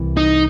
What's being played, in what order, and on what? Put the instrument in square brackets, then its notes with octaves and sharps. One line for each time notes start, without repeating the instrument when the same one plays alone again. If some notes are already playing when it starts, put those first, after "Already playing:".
Already playing: [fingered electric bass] C2 C3 E3
[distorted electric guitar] D#4